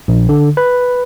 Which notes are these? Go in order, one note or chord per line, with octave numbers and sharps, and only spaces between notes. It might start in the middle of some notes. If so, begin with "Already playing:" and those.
A#1
D3
B4